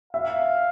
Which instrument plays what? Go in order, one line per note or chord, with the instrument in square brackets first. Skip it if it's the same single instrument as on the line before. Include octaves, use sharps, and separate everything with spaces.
[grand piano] E5 [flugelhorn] F5